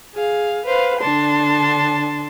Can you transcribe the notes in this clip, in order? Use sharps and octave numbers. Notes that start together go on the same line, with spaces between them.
G#4 F5
B4 C5 F5
D3 D4 A5 C6